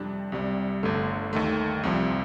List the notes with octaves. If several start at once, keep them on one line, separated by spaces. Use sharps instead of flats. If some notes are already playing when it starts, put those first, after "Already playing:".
Already playing: F2 C3 G3 D4
C2 C3 G3
G1 G2 D3 A3
D#2 D#3 A3
C2 C3 F3